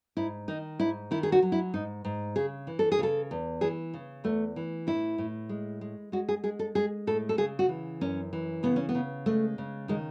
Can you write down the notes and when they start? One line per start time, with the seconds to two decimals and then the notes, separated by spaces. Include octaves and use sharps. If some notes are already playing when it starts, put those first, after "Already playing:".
0.17 G#2 E4
0.48 D#3 D#4
0.80 G#2 E4
1.11 D#3 E4
1.23 G#4
1.32 F#4
1.42 F#3
1.52 E4
1.74 G#2 D#4
2.05 G#2
2.36 C#3 G#4
2.67 E3
2.79 A4
2.92 G#4
2.99 C#3 A4
3.31 E2
3.61 E3 G#4
3.94 C#3
4.24 E2 A3
4.56 E3
4.87 A2 E4
5.18 A2
5.49 G#3
5.81 G#3
6.12 G#3 F#4
6.29 G#4
6.44 G#3 G#4
6.59 A4
6.75 G#3 G#4
7.07 A2 A4
7.29 A4
7.38 C#3 G#4
7.59 F#4
7.69 E3
8.01 F#2 C#4
8.33 E3
8.63 C#3 B3
8.76 C#4
8.89 B3
8.95 C#3
9.26 G#3 A3
9.58 C#3
9.88 D#3 G#3